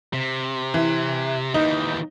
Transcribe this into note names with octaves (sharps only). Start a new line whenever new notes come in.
C3
E3
D#2 E3 D#4